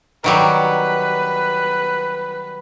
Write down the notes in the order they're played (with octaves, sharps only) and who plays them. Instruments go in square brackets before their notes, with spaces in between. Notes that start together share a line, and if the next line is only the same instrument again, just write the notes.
[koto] D#3 F#3 G3 [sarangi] B4